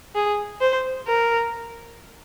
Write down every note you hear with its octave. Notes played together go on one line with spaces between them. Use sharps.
G#4
C5
A#4